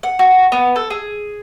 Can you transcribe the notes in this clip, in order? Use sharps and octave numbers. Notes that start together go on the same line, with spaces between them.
F#5
F#4
B3
A4
G#4